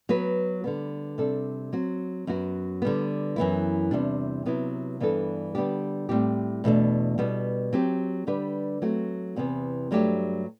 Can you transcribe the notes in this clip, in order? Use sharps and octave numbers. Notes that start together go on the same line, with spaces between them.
F#3 B3 F#4 B4
D3 G3 B3
C3 G3 D4 A4
F#3 C4 F#4
F#2 F#3 B3 F#4
D3 G3 B3
F#2 E3 B3 E4
E2 C3 G3 D4
C3 F#3 B3 E4
G2 E3 B3 D4 A4
D3 G3 B3 D4 G4
A2 G3 C4 G4
E2 B2 A3 D4
B2 G3 B3
F#3 C4 G4
D3 G3 D4 G4 B4
F#3 A3 C4 F#4
E2 C3 E3 B3
G2 F#3 A3 D4 G4